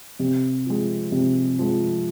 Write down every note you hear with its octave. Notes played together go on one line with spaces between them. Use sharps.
C3
F3 G#3
C3
F3 G#3